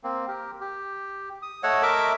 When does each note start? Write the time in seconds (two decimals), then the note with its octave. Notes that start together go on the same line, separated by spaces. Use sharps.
0.04 A#3 C4
0.28 G4 A#4
0.61 G4
1.42 D#6
1.63 A3 C#5 D#5 F#5 E6
1.83 A#4 E5 D6